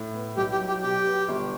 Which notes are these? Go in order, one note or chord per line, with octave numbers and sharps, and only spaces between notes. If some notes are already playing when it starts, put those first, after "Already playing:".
Already playing: A2
B3
B1 G4
G4
F#3
G4
B2 G4
B3
G1